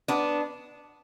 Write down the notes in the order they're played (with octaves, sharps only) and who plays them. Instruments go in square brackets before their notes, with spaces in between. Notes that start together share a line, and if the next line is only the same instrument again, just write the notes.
[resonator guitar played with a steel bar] B3 D4